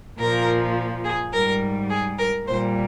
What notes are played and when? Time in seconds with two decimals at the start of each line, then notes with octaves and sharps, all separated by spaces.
0.18 A#2 F3 A#4
1.04 G#4
1.33 G#2 G3 A#4
1.89 G#4
2.18 A#4
2.46 A#2 G3 C5